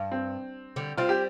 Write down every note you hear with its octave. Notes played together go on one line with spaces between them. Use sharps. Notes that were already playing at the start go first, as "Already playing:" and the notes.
Already playing: G2
C4
D3 G3
G3 C4 F4
G4